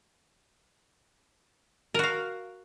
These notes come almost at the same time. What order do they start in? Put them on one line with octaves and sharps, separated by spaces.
A#4 F#4 F5